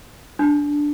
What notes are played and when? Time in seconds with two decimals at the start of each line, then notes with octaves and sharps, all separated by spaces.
0.39 D4